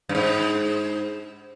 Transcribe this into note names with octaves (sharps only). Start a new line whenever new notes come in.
G2
G#2